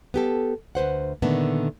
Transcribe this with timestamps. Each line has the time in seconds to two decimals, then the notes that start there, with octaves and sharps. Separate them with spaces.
0.14 B3 G4 A4
0.75 D2 B4 C5 F#5
1.22 A#2 D3 D#3 A3 B3